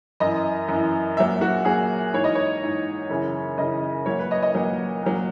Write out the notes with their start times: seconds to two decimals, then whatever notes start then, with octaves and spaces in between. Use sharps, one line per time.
0.20 F#2 E3 D#5
0.68 F#2 E3
1.17 A#2 F#3 E5
1.41 F#4
1.65 A#2 F#3 G#4
2.13 G#2 E3 C#5
2.24 D#5
2.35 C#5
2.62 G#2 E3
3.10 F#2 C#3 E3
3.58 F#2 C#3 E3 D#5
4.06 A#2 F#3 C#5
4.19 B4
4.31 D#5
4.43 D#5
4.55 A#2 F#3
5.03 A#2 F#3